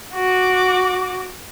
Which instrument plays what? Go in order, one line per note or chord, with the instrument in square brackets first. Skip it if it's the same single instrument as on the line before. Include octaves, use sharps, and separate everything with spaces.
[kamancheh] F#4 D6